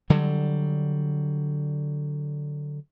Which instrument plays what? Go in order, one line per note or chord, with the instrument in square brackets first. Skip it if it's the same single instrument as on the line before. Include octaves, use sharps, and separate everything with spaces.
[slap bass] D3 F#3 G3